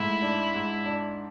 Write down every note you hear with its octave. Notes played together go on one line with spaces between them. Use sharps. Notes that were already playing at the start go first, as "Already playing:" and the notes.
Already playing: G#2 A3 E4
D4
G#2
D4